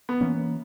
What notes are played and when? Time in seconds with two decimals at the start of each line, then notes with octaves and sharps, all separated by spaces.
0.09 B3
0.21 E3 A#3 C#4